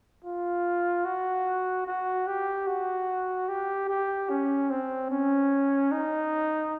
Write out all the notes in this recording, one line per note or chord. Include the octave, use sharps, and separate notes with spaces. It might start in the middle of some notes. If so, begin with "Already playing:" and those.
F4
F#4
F#4
G4
F#4
G4
G4
C#4
C4
C#4
D#4